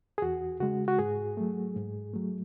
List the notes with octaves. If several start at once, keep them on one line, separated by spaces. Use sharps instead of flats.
G#4
E2 F#4
C#3 G#3 F#4
F#4
G#2 G#4
F#3 A3
G#2
F#3 A3